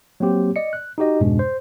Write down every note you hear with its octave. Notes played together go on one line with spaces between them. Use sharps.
F#3 A#3 C4 G4
D5 D#5 C#7
F#6
D#4 F#4 G4 D#5
F2 G#2 B2 G#3 D4
C5